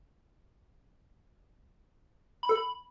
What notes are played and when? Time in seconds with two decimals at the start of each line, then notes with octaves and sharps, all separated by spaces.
2.43 B5
2.49 A4
2.56 B5